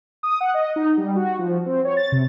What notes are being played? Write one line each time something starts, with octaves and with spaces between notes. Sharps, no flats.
D#6
F#5
D#5
D#4
G3
F#4
F3
C4
C#5
A6
C3